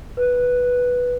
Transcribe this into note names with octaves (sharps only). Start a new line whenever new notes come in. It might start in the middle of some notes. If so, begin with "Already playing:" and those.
B4